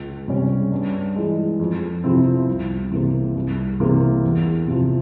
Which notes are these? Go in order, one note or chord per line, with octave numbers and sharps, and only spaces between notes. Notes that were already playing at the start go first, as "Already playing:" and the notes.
Already playing: C#2
C3 G3 C#4
G2
E3 G#3
F2
C3 F3 C4 E4
C2
C3 E3 A#3
C2
C3 E3 A#3
E2
C3 F3